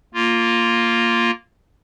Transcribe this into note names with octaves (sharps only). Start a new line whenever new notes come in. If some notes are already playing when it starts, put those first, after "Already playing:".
A#3 F4